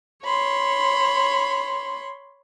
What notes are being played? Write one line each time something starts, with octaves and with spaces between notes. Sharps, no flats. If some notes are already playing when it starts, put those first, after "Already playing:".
C#5 B5 C6